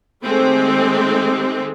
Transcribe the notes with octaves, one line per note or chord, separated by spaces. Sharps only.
D#3 G#3 A3 C4 G4